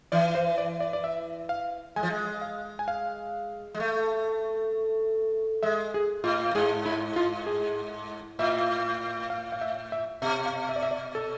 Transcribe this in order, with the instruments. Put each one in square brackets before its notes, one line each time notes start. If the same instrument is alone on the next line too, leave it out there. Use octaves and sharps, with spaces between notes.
[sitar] E3 [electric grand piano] D5
[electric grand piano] C5
D5
D5
D5
E5
F5
[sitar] G#3 [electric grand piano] G#5
[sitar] F3
G#3
[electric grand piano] F5
G#5
F5
[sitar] G#3
A3
[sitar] G#3 [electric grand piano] E5
[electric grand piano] G#4
[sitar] A2 [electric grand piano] F4
[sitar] G#2 [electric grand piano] G#4
[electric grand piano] E4
F4
G#4
[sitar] A2 [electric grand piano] E5
[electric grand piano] F5
F5
E5
E5
[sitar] B2 [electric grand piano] E5
[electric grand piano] F5
E5
D5
E5
D5
A4